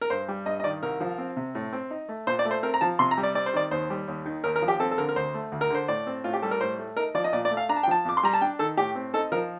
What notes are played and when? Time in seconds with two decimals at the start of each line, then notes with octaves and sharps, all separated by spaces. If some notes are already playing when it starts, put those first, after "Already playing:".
0.01 A#4
0.10 G2 C5
0.28 G3
0.46 G2 D#5
0.60 D#5
0.64 D#3 D5
0.83 C2 A#4
1.00 F3
1.18 C4
1.36 C3
1.55 A2
1.73 C4
1.91 D#4
2.09 A3
2.27 A#2 C5
2.39 D5
2.45 A3
2.51 C5
2.63 C4 A#4
2.74 A#5
2.81 F3 A5
2.99 C3 C6
3.11 A#5
3.17 G3
3.23 D5
3.35 C4 D5
3.46 C5
3.53 D#3 D5
3.71 D#2 C5
3.90 G3
4.08 D#2
4.26 D#3
4.44 D#2 A#4
4.56 A#4
4.62 F3
4.68 G4
4.80 C4 A4
4.91 A4
4.98 D3 A#4
5.09 A#4
5.16 D2 C5
5.34 A3
5.52 D2
5.61 A#4
5.70 D3 C5
5.88 A2 D5
6.07 C4
6.24 A2 F4
6.33 G4
6.42 G3 A4
6.51 A#4
6.61 A2 C5
6.79 A3
6.97 D#4 A#4
7.14 F3 D5
7.24 D#5
7.33 A#2 D5
7.45 D5
7.51 A3
7.57 F5
7.69 D4 A#5
7.76 A5
7.83 G5
7.88 F3 A5
8.05 F2 D6
8.17 C6
8.23 G3 A#5
8.33 A5
8.42 D4 G5
8.59 D#3 A4
8.77 A2 G4
8.95 C4
9.14 D#4 A4
9.32 F3 A#4